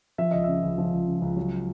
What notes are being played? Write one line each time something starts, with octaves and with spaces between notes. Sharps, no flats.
F3 E5
C#2 D#5
C#3 E5
C#2
F3
C#2
C#3
C#2
F#3